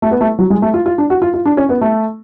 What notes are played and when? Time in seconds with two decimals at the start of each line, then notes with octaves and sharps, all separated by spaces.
0.02 A3
0.11 B3
0.21 A3
0.39 F#3
0.50 G#3
0.62 A3
0.74 F4
0.86 F4
0.98 D4
1.10 F#4
1.22 F4
1.34 F4
1.46 D4
1.57 C#4
1.69 B3
1.81 A3